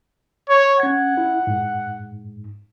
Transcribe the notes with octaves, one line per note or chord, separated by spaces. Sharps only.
C#5
C#4 F#5 G#6
E4
G#2